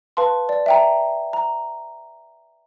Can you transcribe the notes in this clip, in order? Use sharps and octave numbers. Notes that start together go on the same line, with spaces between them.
B4 F5 A5 C6
D5
E5 G5 A#5
A#5